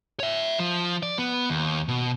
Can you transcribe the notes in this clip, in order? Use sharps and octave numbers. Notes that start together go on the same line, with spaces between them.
C#5 E5
F3
D5
B3
D#2
B2